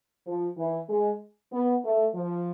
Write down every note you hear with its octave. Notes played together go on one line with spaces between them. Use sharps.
F3
E3
G#3
B3
A3
F3